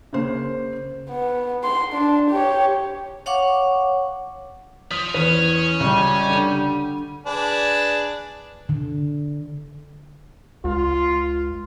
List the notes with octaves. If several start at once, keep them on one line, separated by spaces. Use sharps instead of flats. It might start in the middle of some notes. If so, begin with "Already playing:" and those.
C#3 A#3 C5
B3
C6
D4
G4 C#5
C#5 F5 F#5 C#6 D6
F3 D#6 B6
E2 C#4 B4
C#2 G3 C#6
D3 D#7
D4 G#4 B4
D3
C#2 F4